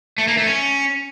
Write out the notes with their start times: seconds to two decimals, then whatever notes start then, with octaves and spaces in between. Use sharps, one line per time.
0.18 A3
0.28 A#3
0.37 A3
0.47 C#4